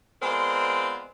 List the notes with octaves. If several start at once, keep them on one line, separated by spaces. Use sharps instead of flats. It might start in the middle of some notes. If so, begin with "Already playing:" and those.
G#3 B3 C4 F4 A#4 D5